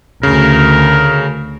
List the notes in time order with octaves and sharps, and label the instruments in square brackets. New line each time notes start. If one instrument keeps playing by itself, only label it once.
[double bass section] D2 [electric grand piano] C#3 [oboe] A#4